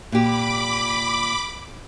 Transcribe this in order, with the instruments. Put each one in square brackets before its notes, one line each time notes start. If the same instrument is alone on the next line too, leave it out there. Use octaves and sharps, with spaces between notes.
[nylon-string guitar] A#2 G4 [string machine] B5 D6